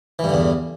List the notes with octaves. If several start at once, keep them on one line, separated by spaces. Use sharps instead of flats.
E2 G2 D3 E3